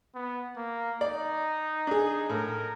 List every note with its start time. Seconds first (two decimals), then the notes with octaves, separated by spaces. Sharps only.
0.15 B3
0.57 A#3
1.01 D#4 D5
1.87 D4 G#4
2.30 A2 A#4